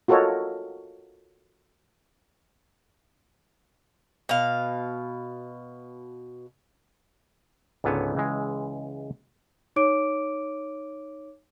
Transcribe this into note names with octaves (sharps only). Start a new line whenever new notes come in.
F4 F#4 A4 A#4 C#5 D#5
B2 F5
C#2 G#2 D3 B3 C#5
C#2 E3 G#3
D#4 C#5 D6 D7